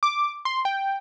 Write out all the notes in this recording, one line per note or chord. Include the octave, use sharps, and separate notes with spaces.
D6
C6
G5